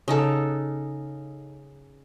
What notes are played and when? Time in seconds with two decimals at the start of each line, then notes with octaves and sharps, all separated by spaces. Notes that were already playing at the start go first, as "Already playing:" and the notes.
0.08 C#3 D#4 A4